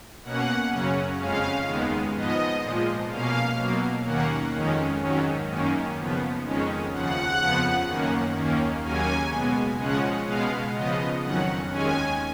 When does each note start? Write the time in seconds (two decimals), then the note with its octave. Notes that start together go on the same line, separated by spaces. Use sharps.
0.23 B2 A#3 C#4 F#5
0.70 F#2 C#3 F#3 C#4
1.19 F2 C#3 G#3 C#4 F5
1.66 D#2 D#3 G#3 B3
2.14 G#2 F3 B3 D#5
2.62 A#2 F3 G#3
3.10 B2 A#3 C#4 F5
3.57 B2 F#3 A#3
4.05 D#2 D#3 A#3 C#4 F#5
4.53 F2 D#3 G#3 C#4
5.01 G#2 D#3 F#3 C#4
5.49 F#2 D#3 A#3 C#4
5.97 C#3 F3 B3
6.44 F2 D#3 G#3 C#4
6.92 D#2 C#3 F3 F#5
7.40 F2 C#3 F3 B3
7.88 F#2 D#3 A#3 C#4
8.36 D#2 D#3 A#3 C#4
8.83 D#2 C#3 F#3 A#3 C#4 G#5
9.32 B2 G#3 B3
9.79 C#3 F3 G#3 C#4 F#5
10.26 B2 G#3 B3 F5
10.75 C#3 F3 B3 D#5
11.22 F2 D#3 F#3 C#4 F#5
11.70 D#2 D#3 G#3 C#4 G#5